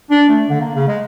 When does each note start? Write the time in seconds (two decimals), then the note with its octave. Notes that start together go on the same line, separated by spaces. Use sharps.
0.10 D4
0.29 A3
0.49 D3
0.61 A#3
0.75 C#3
0.88 G#3